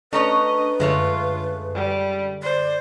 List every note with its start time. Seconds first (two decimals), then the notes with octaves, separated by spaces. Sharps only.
0.13 A3 C#4 D4 B4 C#5 D#5 A#5
0.80 F#2 D3 G#3 A3 F4 C#5
1.74 G3
2.42 C5 D5